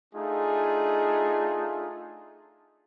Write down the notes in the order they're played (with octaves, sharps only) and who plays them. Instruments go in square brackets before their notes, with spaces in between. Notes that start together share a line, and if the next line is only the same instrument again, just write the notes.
[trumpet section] A3 D4 D#4 F4 G#4